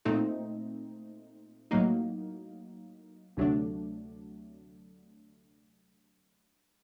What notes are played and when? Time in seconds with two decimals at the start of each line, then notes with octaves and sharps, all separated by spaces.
0.05 A#2 A3 C4 D#4
1.71 A2 F#3 A#3 D#4
3.37 D2 C3 F#3 A3 D4